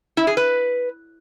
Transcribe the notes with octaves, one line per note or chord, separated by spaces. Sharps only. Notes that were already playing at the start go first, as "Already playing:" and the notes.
E4
G#4
B4